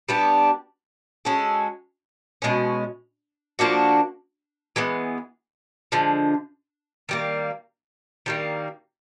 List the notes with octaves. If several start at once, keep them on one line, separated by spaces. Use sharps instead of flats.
G3 B3 D4 G4
G#3 C#4 F#4 A4
B2 G#3 C#4
F3 A#3 D4 F#4
E3 G#3 B3
D3 F3 G#3
D#3 G3 A#3
D#3 G3 A#3